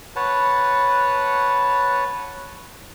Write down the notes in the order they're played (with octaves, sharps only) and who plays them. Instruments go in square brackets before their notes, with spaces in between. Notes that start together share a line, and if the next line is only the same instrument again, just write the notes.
[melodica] B4 C#5 F#5 A5